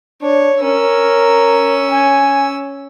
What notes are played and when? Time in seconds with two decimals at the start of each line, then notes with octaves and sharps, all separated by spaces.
0.22 D4 C#5
0.62 C#4 A#4 E6
1.91 G#5